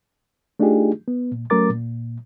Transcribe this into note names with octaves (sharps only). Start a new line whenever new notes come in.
A3 D4 D#4 F4 G4 G#4
B3
A#2
F#3 A3 C#4 A#4 D6 A6
A#2